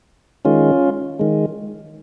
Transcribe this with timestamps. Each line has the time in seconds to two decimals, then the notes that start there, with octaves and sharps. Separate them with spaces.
0.45 D#3 G#3 C#4 F4
1.19 D#3 G#3